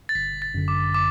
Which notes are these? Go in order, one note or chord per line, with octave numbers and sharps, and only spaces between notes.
A6
G1 B6
A6
F#2 D3
D6
D6